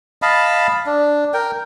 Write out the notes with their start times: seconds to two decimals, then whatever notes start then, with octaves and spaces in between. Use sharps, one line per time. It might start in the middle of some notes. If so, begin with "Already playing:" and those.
0.22 D#5 F5 A5 B5
0.86 D4
1.34 A#4 G5